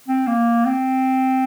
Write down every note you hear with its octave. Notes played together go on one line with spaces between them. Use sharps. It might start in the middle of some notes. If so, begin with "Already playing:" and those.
C4
A#3
C4